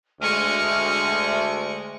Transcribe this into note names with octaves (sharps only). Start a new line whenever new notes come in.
D2 G#3 A3 C#6 F6